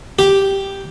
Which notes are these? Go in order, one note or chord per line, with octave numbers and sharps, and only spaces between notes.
G4